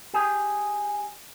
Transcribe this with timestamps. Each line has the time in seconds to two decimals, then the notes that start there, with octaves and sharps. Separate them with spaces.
0.14 G4 G#4